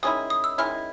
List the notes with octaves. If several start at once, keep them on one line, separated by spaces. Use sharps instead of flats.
D#3 G#3 C#4 E4 D#6
D#6
E6
D#3 G#3 C#4 E4 F6